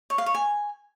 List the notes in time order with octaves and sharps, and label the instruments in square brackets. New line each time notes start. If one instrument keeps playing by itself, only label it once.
[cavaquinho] C#5
F5
C#5
G#5